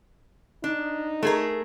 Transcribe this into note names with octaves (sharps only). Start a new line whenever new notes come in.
D4 D#4
A3 G#4 A#4